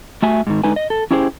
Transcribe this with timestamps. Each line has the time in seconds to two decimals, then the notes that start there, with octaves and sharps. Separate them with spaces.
0.23 A3 F#4 E5 G#5
0.47 G#2 D#3
0.64 D3 G#3 D#4 B4 G#5
0.76 D#5
0.90 A4
1.11 C#4 E4 G4 G#4 C5